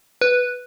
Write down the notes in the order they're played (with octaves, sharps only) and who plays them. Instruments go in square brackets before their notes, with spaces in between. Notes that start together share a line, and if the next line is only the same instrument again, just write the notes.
[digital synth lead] B4